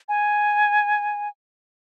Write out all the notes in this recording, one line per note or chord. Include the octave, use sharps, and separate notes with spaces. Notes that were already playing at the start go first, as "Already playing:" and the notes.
G#5